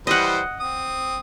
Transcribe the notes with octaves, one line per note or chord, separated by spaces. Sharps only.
E3 G3 C5 D#5 F#5
C4 D#6